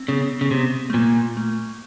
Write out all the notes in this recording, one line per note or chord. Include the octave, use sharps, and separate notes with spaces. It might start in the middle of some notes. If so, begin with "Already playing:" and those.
Already playing: C4
C#3 B3
C#3
C3 B3
A3
A#2 A#3
A3